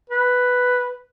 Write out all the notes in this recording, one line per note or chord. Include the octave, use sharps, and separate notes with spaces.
B4